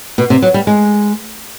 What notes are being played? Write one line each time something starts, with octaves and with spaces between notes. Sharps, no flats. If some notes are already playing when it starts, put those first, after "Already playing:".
B2
C3
F#3
G3
G#3